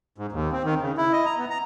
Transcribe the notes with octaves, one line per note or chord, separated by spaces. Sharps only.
G#2
D#2
C4
D#3
C#3
E4
D#5
A#5
B3
A#5